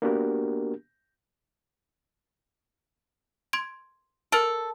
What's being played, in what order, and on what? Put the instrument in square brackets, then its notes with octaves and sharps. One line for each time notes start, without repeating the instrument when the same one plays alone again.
[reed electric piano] A#3 B3 D4 F#4 G4 A#4
[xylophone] C6 G#6 D7
[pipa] A4 [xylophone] A#4 F6 D7